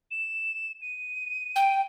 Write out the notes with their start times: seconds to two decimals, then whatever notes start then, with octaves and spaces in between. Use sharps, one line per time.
0.11 E7
0.81 D#7
1.56 G5